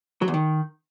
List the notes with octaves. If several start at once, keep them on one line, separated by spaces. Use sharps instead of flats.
F#3
E2
D#3